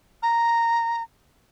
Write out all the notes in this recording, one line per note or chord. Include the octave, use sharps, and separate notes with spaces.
A#5